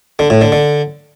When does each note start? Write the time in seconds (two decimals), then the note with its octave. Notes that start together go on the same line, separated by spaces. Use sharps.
0.19 D3
0.30 A2
0.41 D3
0.52 D3